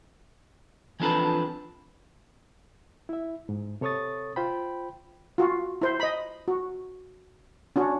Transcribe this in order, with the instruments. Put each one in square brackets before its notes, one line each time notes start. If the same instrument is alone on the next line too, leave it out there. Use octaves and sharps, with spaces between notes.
[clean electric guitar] E3 F3 C4 D4 A4 B4
[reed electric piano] E4 E5
G#2
C3 A4 C#5 C#6 D#6 A6
F4 C5 G5 B5
[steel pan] F4 F#4
E4 C5
D#5 B5
F#4
C#4 D4 F#4